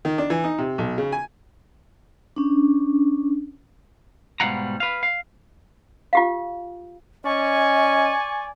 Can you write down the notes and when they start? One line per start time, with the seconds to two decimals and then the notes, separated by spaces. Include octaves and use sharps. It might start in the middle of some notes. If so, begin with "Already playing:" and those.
0.05 D#3
0.18 D4
0.30 E3
0.44 D#4
0.58 C3
0.78 B1
0.98 C#3
1.12 G#5
2.36 C#4 D4
4.40 G#2 B2 G3 F5 F#5 A#5
4.80 B4 F5
5.03 F5
6.13 F4 G4 F5
7.25 C#4 D5 D#5 G#5 C#6